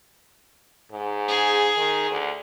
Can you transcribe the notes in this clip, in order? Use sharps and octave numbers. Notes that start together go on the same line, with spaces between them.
G#2
G#4
D#3
D2